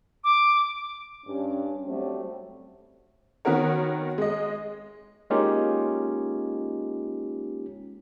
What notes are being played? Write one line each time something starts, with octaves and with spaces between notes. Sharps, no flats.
D6
G2 C#4
F#3 G3 A3 C4
D#3 B3 F#4 A#4 C#5
G#3 D#5
G#3 A#3 C#4 D#4 F4 G4